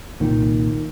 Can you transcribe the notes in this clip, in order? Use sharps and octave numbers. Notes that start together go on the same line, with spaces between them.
C2 A#2 D#3